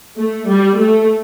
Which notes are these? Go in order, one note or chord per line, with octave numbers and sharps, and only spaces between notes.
A3
G3
A3